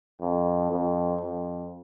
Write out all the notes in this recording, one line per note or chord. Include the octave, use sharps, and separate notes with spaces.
F2
F2
F2